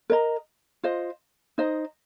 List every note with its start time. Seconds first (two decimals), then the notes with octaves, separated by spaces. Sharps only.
0.10 A#4 D#5 A#5
0.83 F4 C5 D#5
1.58 D#4 C5 D#5